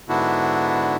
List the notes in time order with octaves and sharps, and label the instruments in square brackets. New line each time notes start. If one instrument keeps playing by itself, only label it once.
[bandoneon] G#2 D3 B3 D4 E4 F#4